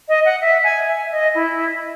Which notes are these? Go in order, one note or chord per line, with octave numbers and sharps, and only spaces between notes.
D#5
F#5
E5
G#5
E5
D#5
E4